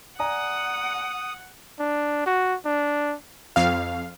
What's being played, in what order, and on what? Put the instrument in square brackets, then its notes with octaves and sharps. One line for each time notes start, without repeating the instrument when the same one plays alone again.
[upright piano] D5 G#5 A#5 [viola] F#5 [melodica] D#6
[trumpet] D4
F#4
D4
[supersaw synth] F2 F5